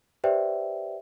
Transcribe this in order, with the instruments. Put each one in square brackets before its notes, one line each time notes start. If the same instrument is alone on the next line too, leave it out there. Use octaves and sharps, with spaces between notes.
[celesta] G4 B4 C5 D5 E5 G5